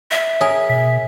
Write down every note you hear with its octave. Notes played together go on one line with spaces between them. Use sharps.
E5
G#4 A#4 C#5 D#6
B2 B6